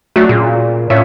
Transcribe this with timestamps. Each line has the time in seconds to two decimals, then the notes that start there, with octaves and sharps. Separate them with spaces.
0.16 F#3 A3 D4
0.29 A#2 C#3
0.90 A2 C#4 F4 E5